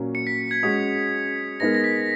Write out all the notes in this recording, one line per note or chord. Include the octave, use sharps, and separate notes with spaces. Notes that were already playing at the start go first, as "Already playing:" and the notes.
Already playing: A#2 F#3 A#3 C#4
C#7
B6
G#6
G#3 C#4 F#4 D#6
G#3 B3 D#4 A#4 A#6
A#6
B6